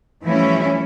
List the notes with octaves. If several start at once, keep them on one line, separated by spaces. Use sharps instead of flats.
E3 F3 G3 A3 C#4 E4